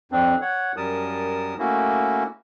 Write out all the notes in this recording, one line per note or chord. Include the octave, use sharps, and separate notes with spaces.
F2 C4 D4
C#5 F#5
F#2 G3 A#4 A5 D#6
A3 A#3 C#4 E4 F#4